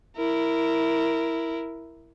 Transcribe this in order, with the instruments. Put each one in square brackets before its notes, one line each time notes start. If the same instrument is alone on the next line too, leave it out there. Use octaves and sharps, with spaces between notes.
[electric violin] E4 A#4